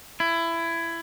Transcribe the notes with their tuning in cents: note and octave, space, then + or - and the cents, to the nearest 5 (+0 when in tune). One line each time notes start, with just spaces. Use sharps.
E4 +20